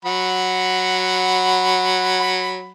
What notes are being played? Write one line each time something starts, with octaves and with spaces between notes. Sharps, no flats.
F#3 F#5 B5